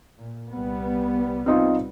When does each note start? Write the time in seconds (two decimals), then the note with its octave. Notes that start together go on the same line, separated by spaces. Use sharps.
0.18 A#2
0.50 C2 G3 B3
1.46 C4 D#4 F4